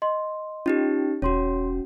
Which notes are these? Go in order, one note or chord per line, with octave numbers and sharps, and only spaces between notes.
D#5 C6
C#4 D#4 F4 G4
E1 C#4 F#4 C#5 C6